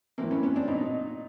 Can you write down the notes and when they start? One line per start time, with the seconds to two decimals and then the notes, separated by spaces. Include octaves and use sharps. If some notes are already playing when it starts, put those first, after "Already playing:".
0.18 A2 E3 A#3 C4
0.31 B3 C#4
0.43 B3 C#4
0.56 C4 D4
0.68 A#2 D#4